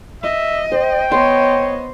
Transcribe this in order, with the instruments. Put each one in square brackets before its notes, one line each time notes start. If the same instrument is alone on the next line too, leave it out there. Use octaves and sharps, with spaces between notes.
[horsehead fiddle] D#5 [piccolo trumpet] E5
[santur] C5 [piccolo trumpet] G5
[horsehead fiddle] B3 D#5 [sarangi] C#5 [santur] C6